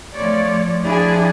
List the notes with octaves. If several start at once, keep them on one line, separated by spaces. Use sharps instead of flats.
F3 A3 C#5 D5
F3 D4 E4 G#4